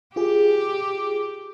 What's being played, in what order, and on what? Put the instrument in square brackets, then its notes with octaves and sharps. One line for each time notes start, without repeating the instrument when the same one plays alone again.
[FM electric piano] F4 G#4 [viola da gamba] G4